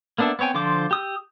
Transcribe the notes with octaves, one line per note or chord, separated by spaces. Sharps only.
A#3 B3 D4 A4 E5
B3 C4 C#5 G5 G#5
D3 F3 F4 C5 D6
G4 D#6 E6